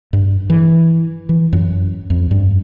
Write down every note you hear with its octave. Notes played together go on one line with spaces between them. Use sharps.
G2
E3
E3
F#2
F2
G2